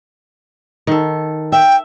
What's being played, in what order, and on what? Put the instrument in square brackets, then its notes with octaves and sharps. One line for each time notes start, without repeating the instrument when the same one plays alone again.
[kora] D#3 A4
[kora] E5 [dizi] G5